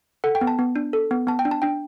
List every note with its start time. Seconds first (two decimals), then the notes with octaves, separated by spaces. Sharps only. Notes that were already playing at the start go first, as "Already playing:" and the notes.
0.24 A4 F#5
0.35 G5
0.41 B3
0.47 A5
0.59 B3
0.76 D4
0.93 A4
1.11 B3
1.27 B3 A5
1.39 G5
1.45 D4
1.51 A5
1.62 D4 G5